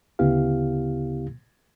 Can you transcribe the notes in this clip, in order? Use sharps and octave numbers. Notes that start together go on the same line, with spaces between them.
D2 C#3 B3 E4 G4 F5